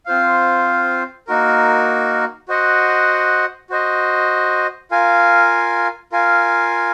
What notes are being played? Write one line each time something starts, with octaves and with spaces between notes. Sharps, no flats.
C4 F4 C5 F5
A#3 D#4 F#4 A#4
F#4 C5 D#5 F#5
F#4 C5 D#5
F4 A#4 F5 G#5
F4 A#4 F5 G#5